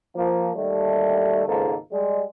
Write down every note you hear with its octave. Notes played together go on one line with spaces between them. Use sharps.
F3 A#3
D#2 G3 A3
G#1 C#2 G#2 A#3 A4
G3 G#3